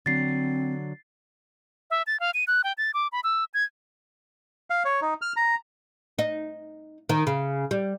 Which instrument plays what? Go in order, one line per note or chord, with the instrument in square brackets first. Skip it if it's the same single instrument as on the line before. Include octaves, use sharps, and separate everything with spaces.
[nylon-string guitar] D3 F#3 [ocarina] C4 [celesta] A6 C7
[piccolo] E5
A6
F5
D#7
F#6
G5
A6
D6
B5
E6
G#6
[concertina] F5
C#5
D#4
F6
A#5
[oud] D#4
D#3
C#3
G3